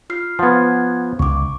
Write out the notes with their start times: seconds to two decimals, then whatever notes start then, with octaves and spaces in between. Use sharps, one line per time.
0.10 F4 F6 C7
0.39 F3 B3 F#5 G#6
1.19 C#2 C#6 D6